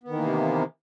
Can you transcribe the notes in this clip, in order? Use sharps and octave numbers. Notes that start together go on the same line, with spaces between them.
C3 D#3 E3 A#3 B3